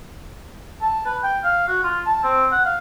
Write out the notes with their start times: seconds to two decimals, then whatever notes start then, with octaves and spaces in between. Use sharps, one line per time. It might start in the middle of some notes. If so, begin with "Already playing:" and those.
0.82 A5
1.06 B4
1.23 G5
1.44 F5
1.68 F#4
1.83 F4
2.06 A5
2.23 C4
2.52 F#5
2.65 F5